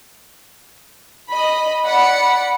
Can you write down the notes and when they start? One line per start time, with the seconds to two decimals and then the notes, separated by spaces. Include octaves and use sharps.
1.30 D#5 B5
1.86 D5 F#5 B5 C#7